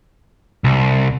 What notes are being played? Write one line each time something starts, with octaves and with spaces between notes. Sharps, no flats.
C2